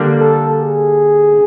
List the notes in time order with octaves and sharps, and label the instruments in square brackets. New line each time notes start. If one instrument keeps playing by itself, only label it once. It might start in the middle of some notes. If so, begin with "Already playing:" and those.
Already playing: [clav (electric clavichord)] D3 G3 A#3 D4
[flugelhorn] A4
G#4